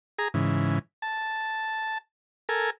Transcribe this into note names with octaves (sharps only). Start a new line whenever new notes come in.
G#4 A#5
G#2 C#3 E3
A5
A4 A#4 G#5